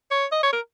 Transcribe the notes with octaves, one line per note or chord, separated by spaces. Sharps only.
C#5
D#5
C#5
A#4